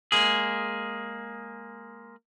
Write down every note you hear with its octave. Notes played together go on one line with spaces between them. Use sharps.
G#3 A#3 G#4